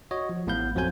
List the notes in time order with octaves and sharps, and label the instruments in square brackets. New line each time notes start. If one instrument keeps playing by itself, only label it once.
[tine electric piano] F#4 C#5 D#5
F3
A1 A2 B3 B4 F5 G6
F2 F3 F#3 C5 G#5 G6